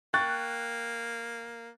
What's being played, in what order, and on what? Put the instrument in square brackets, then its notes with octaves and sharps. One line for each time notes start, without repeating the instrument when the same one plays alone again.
[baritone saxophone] A#3 [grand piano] G5 C#6 A6 [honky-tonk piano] F#6